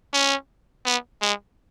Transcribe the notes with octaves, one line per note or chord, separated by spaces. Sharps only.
C#4
B3
G#3